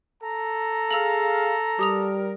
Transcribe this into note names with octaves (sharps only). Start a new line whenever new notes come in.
A4 A#5
G#4 F5 E6 F7 F#7
G3 G4 A#4 D#6 F7